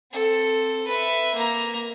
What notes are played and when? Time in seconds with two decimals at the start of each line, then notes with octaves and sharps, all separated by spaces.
0.12 C4 A4
0.88 B4 E5
1.35 A#3 A#5